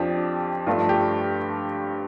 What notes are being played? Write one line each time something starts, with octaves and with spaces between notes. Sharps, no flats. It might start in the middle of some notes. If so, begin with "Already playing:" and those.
Already playing: F2 F3 D4 G4
G2 F3 A3 D4 F4
G4